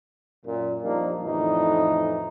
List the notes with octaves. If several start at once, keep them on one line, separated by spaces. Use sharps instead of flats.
F#2 A#2
F3 G3 A#3 D4 D#4
F2 A2 D3 E3 D#4